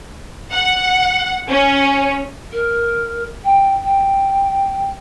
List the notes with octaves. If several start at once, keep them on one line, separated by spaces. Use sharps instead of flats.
F#5
C#4
A#4
G5
G5